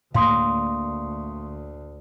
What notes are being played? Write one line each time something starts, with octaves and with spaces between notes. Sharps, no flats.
D2 A2 A#3 F5 C6 D#6